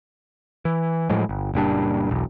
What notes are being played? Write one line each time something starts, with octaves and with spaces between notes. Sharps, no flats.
E3
A2 F3 F#3 G#3
G1
F#1 A#2 G3 D4
E1 B1